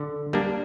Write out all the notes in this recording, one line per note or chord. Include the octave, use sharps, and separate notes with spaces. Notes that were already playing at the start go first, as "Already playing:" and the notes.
Already playing: D3
G3 A#3 D4